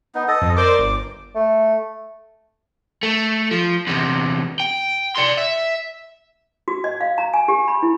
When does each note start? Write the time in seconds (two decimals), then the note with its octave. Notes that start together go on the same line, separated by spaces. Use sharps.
0.15 B3 D#4
0.28 A4 D#5
0.42 F2
0.57 A#4 C5 D5 D6
0.79 G1
1.35 A3
3.03 A3
3.51 F3
3.87 E2 C3
4.60 G5
5.16 D5 C6
5.38 E5
6.68 F#4
6.84 D#5
7.01 F5
7.18 A#5
7.34 G#5
7.48 G4
7.68 B5
7.83 E4